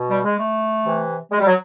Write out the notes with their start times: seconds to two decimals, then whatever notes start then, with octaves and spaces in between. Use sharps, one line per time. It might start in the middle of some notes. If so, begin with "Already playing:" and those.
Already playing: B2
0.09 G3
0.24 G#3
0.39 A3
0.86 C3 E3
1.31 G#3
1.40 G3
1.47 F#3